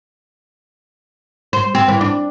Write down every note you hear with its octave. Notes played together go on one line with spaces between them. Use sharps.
C5
C4
E3
D4